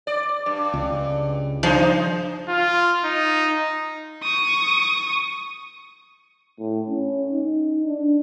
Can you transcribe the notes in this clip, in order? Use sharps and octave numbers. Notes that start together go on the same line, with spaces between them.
D5
G2
C#2
F#2 F3 D#4 C5
F4
D#4
C#6 D#6
A2
C#4
D#4
D4